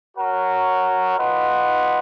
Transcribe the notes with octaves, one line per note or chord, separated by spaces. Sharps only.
F#4 A#4 C#5 F#5
F4 B4 D#5 F#5